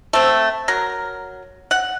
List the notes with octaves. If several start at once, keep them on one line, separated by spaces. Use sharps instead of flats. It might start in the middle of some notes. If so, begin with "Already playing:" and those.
A3 C4
F#3 A#4
F#5